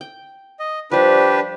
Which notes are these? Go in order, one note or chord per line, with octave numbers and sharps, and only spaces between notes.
G5
D#5
F3 G3 D4 G4 B4